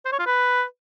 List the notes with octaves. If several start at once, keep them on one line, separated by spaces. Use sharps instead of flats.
C5
C#5
F4
B4